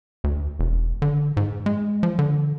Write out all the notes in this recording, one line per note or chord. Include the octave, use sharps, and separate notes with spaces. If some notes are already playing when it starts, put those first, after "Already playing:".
D2
E1
D3
G#2
G#3
F3
D3